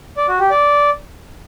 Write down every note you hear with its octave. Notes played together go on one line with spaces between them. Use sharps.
D5
F#4
G4
D5